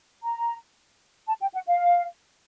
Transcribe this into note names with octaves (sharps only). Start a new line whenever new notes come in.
A#5
A5
G5
F#5
F5